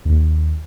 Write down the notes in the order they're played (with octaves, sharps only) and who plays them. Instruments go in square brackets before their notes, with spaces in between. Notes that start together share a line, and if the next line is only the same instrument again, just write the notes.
[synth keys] D#2